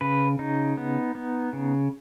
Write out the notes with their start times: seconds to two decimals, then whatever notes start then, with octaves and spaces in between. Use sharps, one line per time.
0.01 C#3 B4
0.39 C#3 D#4
0.77 B3
1.15 B3
1.53 C#3